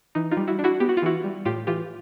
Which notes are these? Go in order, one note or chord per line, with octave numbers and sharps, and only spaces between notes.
E3 D#4
D#4 F4
G3
E4 F#4
D4
E4 F#4
B3 G4
F#4
F4
E3 E4 F#4
G3
A2 F4 G4
E3 F4 G4